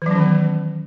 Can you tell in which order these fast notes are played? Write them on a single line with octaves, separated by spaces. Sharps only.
E3 F#3 C#4 D#3 B3